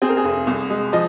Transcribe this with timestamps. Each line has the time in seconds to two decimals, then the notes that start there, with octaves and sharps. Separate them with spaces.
0.02 C4 G#4
0.09 A#4
0.17 G#4
0.24 F1
0.47 C2
0.70 G#3
0.93 F3 D#5